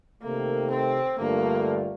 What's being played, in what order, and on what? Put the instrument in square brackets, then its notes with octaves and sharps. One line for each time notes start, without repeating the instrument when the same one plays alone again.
[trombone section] C3 D#3 A3 [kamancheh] A#3
[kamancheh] C4
[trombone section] G2 D3 A3 D4 F4 [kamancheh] A#3